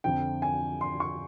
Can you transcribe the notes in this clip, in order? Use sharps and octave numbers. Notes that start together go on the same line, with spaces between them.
F2 D3 F3 G5
G#5
C6
C#6